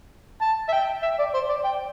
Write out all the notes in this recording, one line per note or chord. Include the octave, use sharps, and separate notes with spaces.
A5
E5
G5
E5
D5
C5
D5
G5